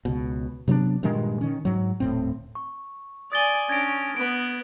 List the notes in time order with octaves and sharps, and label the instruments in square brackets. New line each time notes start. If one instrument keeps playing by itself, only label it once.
[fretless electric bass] C#2 B2
C3 F#3 B3 D4
G2 A#2 D#3 G#3
D#3 C#4
G#2 F#3
D#1 A2 C4
[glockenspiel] C#6
[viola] D5 G#5 [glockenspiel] D#6 A6 G7
[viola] C#4 D4 [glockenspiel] G#6 A#6 D7
[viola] B3 [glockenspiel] D7